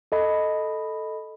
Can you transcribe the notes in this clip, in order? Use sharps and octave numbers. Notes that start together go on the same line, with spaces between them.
A4 D#5 B5